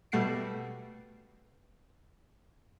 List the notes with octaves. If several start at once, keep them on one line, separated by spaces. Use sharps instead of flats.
B2 G3 A3 F#5 C7 D7